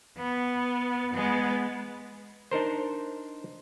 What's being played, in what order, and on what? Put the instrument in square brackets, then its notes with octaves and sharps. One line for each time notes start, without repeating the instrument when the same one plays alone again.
[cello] B3
G#3 B3
[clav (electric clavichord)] D4 D#4 A#4 C5